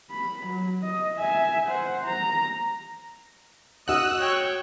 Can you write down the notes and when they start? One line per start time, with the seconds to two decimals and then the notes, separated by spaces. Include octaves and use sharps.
0.10 B5
0.47 F#3
0.82 D#5
1.16 E5 G#5
1.67 C5 F#5
2.05 A#5
3.88 F#4 D#5 F#5 E6 F#6
4.20 C#5 G5